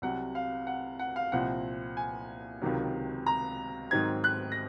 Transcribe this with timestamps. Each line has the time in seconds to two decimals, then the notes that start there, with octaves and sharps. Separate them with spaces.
0.02 C2 C3 F#3 F#5
0.35 F5
0.67 F#5
0.99 F#5
1.16 F5
1.32 C2 A#2 F3 C4 F#5
1.97 G#5
2.62 C#2 C3 D#3 F#3
3.26 A#5
3.91 G#2 D#3 F#3 C4 D#4 G#6
4.24 F#6
4.52 A#6